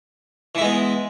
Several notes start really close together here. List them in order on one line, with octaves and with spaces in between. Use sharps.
E3 E4 G#3 B3